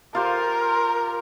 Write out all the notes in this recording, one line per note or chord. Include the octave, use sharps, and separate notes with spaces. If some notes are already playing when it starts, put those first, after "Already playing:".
F4 G4 A#4 C5